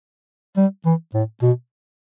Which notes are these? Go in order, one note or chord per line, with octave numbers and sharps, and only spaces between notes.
G3
E3
A2
B2